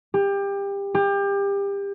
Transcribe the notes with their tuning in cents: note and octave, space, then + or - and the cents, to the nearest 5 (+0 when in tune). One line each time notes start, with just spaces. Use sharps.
G4 +25
G4 +30